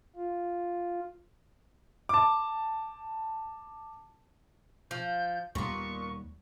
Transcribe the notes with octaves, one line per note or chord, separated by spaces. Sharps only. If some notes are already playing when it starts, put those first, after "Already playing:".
F4
A5 D6
F3 G6
D#2 A#2 G3 B3 C#6